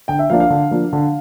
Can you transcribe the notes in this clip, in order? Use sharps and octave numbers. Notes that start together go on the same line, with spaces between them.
D3 G5
E5
F3 A#3 D4 F5
F5
D3
F3 A#3 D4
D3